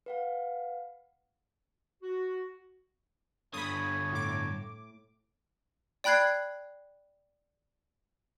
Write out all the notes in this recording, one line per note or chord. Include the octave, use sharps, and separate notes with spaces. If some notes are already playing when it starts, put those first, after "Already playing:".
B4 F5 F#5
F#4
G2 D3 C#5 B5 D#6
A2 D6
D5 G5 B5 F#6 G#6 C7